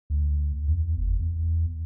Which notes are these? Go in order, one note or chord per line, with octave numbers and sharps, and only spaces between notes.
D2
E2
F#1
E2